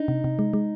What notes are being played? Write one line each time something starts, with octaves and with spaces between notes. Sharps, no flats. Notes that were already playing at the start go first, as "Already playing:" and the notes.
Already playing: D4 D#4
C3
C3
G#3
G#3